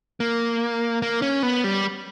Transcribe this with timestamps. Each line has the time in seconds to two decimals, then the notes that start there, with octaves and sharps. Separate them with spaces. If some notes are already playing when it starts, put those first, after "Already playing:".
0.20 A#3
1.02 A#3
1.22 C#4
1.43 B3
1.64 G3